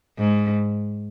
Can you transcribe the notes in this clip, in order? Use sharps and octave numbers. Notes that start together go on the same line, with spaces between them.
G#2